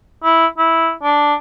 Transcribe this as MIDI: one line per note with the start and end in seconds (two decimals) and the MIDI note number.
0.24 0.46 64
0.58 0.91 64
1.03 1.34 62